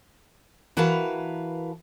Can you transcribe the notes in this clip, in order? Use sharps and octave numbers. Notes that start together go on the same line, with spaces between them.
E3 F#4 A#4 B4 F5 A5